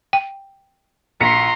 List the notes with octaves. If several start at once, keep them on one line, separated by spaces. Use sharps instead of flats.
G5
A#1 A#5 C6 B6 C#7